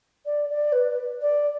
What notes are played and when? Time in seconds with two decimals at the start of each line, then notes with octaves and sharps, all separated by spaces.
0.26 D5
0.50 D5
0.73 B4
1.22 D5